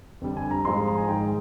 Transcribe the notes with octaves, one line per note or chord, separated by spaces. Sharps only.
F2 D3 G3
G#5
A#5
G#2 F3 G#3 C6
A#5
G#5
G#2 D#3 G#3 G5